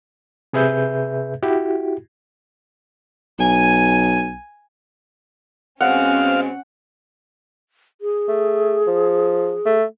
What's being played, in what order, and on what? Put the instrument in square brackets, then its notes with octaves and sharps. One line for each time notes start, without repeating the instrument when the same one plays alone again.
[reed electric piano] C3 G#4 B4 E5 G6
E4 F#4 G4
[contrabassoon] B1 [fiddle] G#5
[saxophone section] B2 G#3 C4 [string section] C#4 [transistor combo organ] F5 [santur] F#5
[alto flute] G#4
[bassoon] A3
F3
A3